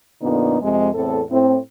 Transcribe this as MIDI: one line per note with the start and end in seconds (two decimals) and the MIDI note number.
0.22 0.57 41
0.22 0.57 46
0.22 0.57 50
0.22 0.57 59
0.22 0.57 62
0.22 0.57 63
0.62 0.89 41
0.62 0.89 48
0.62 0.89 56
0.95 1.20 40
0.95 1.20 45
0.95 1.20 60
0.95 1.20 69
1.30 1.57 45
1.30 1.57 60